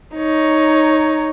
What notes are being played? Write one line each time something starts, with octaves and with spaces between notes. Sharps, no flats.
D#4 C#5